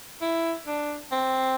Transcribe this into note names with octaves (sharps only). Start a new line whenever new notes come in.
E4
D4
C4